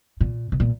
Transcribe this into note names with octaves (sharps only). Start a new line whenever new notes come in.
A#2
B2
A#2